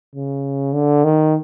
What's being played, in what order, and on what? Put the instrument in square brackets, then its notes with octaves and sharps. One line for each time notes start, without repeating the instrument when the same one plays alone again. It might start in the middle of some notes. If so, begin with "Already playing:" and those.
[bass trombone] C#3
D3
D#3